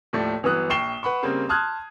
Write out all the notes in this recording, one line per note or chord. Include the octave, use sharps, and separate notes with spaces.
D#2 A2 F3 A3 D5 A5
G1 E3 F#3 B3 D#6 F#6
A#1 G5 C#6 C7 E7 G7
B4 F#5 B5 C#6
C#3 G3 A#3 C4
A5 C6 D#6 F6 F#6 G#6